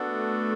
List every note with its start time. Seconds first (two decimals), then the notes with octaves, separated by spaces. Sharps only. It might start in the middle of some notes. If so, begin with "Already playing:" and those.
Already playing: B3 D4 F#4 A4
0.08 A3